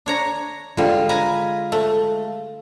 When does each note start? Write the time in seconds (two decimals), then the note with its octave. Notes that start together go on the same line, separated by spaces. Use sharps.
0.06 D4 C#5 A#5
0.77 D3 G3 G#3 F4
1.09 B4 G#5 A#5
1.72 A3